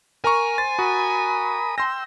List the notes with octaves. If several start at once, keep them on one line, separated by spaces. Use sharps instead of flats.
A#4 G#5 A#5 C#6
C5 A6
F#4 A#4 B5 D#6
G5 C6 E6 A#6